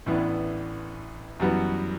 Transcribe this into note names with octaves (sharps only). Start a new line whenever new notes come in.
A1 A2 E3 B3 D4
F#2 E3 G3 B3 F#4